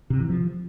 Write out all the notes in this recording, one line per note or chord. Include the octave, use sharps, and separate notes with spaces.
C3
E3
F3